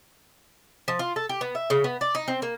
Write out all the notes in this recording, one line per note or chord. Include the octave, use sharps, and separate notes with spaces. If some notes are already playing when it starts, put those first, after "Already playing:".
F3
F4
A4
G4
B3
E5
C#3
B3
D5
D#4
C4
A#3